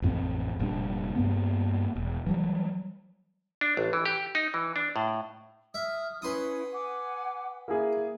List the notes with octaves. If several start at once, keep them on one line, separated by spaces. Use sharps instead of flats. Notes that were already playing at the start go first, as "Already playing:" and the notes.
A1 F2 B3 C4
F1 A#2 G3 D4
G2 A#3 B3
E1
E3 F#3 G3
D4
A1
E3
G4
D#4
E3
D4
A2
E5 D#6 F6
C#4 E4 B4 F#5 C6 D#6
F#5 G#5 D6
A#3 E4 G#4 G#5